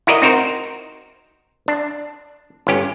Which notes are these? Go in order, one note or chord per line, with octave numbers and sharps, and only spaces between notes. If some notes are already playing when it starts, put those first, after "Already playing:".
E4 F#4 A#4 D5 D#5
C4 D#4 F#4 A#4 C5
D4
G1 C#4 G4